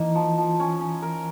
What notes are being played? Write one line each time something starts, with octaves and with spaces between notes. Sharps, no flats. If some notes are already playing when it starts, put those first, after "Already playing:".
Already playing: E3 A#3 D#4
F3
F3
C#4
C#4
A#4